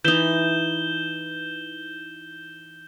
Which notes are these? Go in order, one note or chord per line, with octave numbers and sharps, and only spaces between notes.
E3 D#4 G6 E7 G7